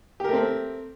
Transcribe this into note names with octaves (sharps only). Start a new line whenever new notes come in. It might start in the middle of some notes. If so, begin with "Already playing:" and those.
A3 C4 G4 A#4